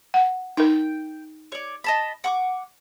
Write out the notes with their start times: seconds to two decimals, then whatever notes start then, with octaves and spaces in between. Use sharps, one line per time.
0.14 F#5
0.57 D#4 A#4 G5
1.52 C#5 D5
1.84 D#5 A5 B5
2.24 F#5 C#6 D6